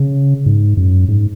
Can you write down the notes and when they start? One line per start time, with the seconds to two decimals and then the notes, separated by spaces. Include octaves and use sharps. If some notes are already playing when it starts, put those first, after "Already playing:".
Already playing: C#3
0.46 G#2
0.77 F#2
1.08 G#2